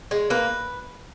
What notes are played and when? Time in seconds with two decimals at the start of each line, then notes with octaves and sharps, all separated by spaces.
0.11 G#3
0.30 A#3 B4